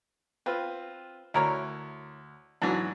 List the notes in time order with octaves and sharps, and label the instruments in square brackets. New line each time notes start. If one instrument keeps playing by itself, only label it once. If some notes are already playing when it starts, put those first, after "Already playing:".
[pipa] C4 [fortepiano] F4 B4
[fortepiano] D2 [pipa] E4 A#4 C#5
[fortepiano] G#2 E3 F#3 [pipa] D4